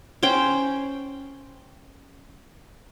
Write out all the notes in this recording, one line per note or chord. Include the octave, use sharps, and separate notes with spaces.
C#4 C5 G5